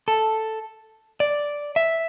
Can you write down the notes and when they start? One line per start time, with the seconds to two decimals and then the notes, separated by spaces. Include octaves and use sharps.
0.08 A4
1.20 D5
1.76 E5